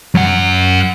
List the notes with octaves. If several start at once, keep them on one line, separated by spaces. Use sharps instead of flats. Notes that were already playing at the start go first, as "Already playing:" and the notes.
F#2 F#5